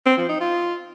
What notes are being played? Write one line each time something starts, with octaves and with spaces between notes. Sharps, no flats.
C4
F3
D#4
F4